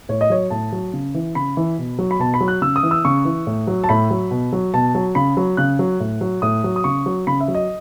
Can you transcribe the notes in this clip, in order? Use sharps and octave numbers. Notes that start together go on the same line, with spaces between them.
A2 C#5
D#5
F#3 C#5
A2 A5
F#3
C#3
E3
C#3 B5
E3
B2
F#3
B5
B2 A5
B5
F#3
F#6
C#3 E6
D#6
E3
E6
C#3 C#6
E3
A2
F#3
A5
A2 B5
F#3
B2
F#3
B2 A5
F#3
C#3 B5
F#3
C#3 F#6
F#3
A2
F#3
A2 D#6
F#3
D#6
C#3 C#6
F#3
C#3 B5
E5
F#3
D#5